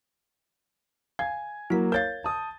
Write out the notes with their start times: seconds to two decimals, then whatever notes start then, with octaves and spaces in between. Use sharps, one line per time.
1.19 F5 G#5 G#6
1.70 F#3 A#3 E4 B6
1.92 A#4 C#5 F5 G6 A6
2.24 A5 D#6